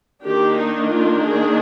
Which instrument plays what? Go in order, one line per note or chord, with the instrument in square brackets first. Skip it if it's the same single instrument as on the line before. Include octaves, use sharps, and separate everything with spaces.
[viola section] D#3 A#3 D4 G4
D#4
F4
G#4